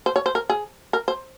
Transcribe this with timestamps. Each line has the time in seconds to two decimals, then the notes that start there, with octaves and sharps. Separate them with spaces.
0.06 C5
0.16 C#5
0.26 C5
0.35 A#4
0.50 G#4
0.93 A#4
1.08 C5